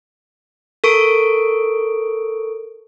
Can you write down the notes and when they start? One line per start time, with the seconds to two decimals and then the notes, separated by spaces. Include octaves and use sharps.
0.84 A4 A#4 C#6 D7